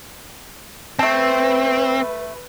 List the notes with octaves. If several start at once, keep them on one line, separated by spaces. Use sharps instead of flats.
A3 C4 B4 A5